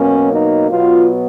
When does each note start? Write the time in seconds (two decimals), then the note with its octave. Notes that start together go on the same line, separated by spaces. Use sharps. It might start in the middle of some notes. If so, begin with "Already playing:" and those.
Already playing: B2 F#3 A#3 C#4
0.31 D#4
0.70 B2 F#3 B3 F4